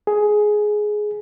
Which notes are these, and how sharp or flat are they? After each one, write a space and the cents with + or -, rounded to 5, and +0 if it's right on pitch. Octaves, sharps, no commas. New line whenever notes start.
G#4 +10